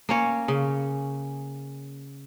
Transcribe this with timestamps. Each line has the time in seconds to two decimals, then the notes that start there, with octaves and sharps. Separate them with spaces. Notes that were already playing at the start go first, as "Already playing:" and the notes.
0.09 A#3 C#4 C#5
0.48 C#3